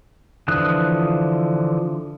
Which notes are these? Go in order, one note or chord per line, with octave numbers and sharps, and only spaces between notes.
D3 E3 F3 D#6 F#6